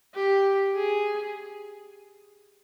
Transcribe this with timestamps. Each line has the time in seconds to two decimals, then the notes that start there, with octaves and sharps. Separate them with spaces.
0.14 G4
0.75 G#4